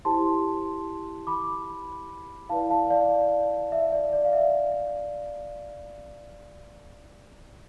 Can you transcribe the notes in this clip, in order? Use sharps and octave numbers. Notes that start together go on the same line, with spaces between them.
E4 G4 C5 A5 C6
B5 D6
E4 B4 D5 F5 A5
F5 A5
D5 F5
E5
D5
D5
F5
E5